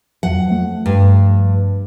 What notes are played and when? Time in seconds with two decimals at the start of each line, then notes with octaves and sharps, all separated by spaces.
0.23 F2 F3 F#3 F#5
0.47 F3 A3
0.86 G2